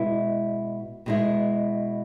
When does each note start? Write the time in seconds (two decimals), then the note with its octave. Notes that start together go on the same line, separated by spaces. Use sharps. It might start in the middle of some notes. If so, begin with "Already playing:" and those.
Already playing: B2 G#3 E4
1.06 B2 G#3 E4